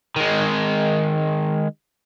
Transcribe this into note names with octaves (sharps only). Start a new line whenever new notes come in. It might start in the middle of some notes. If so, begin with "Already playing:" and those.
D#3 G#3